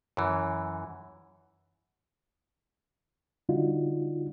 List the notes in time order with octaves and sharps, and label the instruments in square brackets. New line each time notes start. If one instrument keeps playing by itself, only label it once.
[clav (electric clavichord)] F#2 E3
[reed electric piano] D3 G3 D4 D#4 F4 F#4